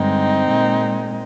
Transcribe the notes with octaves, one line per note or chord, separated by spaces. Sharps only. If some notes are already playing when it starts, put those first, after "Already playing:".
Already playing: G2 D3 G#3 C4 D#4
A#2 G#3